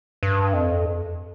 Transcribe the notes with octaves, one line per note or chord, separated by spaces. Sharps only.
G2
F2